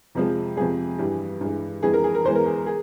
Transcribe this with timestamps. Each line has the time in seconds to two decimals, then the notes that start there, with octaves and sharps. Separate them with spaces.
0.15 F2 C3 F3 G#3
0.57 F2 C3 F3 G#3 G#4
0.99 G2 E3 G3
1.41 G2 E3 G#3
1.83 F2 E3 G#3 G#4
1.94 A#4
2.04 G#4
2.15 A#4
2.25 E2 E3 G#3 C5
2.35 A#4
2.46 G#4
2.67 G#4